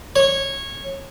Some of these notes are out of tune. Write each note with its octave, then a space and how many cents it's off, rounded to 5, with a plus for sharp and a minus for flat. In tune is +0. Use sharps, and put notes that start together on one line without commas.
C#5 -15